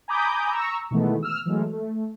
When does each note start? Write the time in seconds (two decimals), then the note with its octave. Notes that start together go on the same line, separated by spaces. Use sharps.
0.08 G#5 A#5 B5 D6 D#6 G6
0.51 A#5 C#6 E6
0.91 B2 D#3 E3 G#3 A3 B3
1.23 E6 F6
1.46 E3 F#3 G#3 A3
1.73 A3